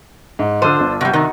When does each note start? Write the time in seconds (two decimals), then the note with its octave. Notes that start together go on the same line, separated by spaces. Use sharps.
0.39 G#2
0.62 D3 D4 F4 C5 E6 D#7
0.80 G1
1.01 C3 G3 F#4
1.13 C3 D#3 D#4